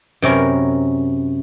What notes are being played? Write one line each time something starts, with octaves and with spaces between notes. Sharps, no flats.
F#2 C3 C#4 A#4 B5